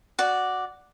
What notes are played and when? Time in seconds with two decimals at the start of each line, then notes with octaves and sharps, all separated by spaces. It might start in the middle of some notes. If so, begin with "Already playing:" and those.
0.19 F#4 D5